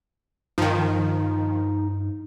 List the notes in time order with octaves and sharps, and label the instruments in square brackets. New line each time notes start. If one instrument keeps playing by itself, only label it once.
[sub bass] G2 [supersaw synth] D#3 F3 [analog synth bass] D#4